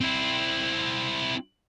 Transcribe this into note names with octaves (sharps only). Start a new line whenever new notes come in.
C4 E4